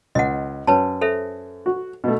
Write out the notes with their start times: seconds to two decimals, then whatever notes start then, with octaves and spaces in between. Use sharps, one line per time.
0.15 C#2 D#5 F#5
0.67 F#2 B4 C#5 A5
1.01 A4 C5 E5
1.66 F#4
2.04 B2 A3